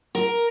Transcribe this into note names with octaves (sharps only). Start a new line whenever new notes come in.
A#4